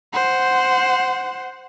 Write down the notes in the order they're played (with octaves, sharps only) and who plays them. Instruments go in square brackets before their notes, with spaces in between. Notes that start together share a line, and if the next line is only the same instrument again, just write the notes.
[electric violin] C5 F#5